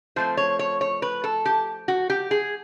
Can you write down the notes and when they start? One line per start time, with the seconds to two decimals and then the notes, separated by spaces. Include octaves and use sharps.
0.16 F3 A3 C4 C5
0.37 C#5
0.59 C#5
0.81 C#5
1.02 B4
1.24 A4
1.45 G4
1.88 F#4
2.10 G4
2.31 G#4